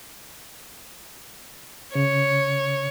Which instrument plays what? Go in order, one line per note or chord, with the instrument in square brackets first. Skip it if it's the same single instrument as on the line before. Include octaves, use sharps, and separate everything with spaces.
[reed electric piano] C#3 [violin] C#5